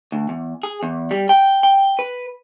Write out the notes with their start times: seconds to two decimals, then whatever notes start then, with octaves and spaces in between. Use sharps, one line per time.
0.12 D2
0.29 E2
0.63 G#4
0.83 E2
1.11 G3
1.29 G5
1.63 G5
1.99 B4